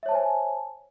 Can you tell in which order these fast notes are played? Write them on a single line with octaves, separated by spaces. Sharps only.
E5 C#5 A5 C5 G#5